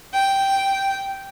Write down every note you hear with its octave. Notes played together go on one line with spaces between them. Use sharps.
G5